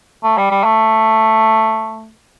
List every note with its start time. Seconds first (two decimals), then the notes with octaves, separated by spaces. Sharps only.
0.23 A3
0.38 G3
0.51 G3
0.64 A3